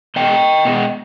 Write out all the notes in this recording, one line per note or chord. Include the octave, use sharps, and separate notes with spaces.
B2 G#3 D#5 G5
B2 G#3